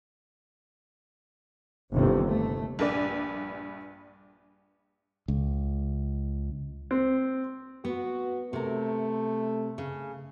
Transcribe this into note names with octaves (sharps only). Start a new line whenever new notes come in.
G1 D#2 C3
A3
A#1 G2 B4 D5
C#2
C4
B3 F#4
C3 A3 A#4
C#3